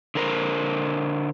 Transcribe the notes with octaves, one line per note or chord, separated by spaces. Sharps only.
D3 A#4 C5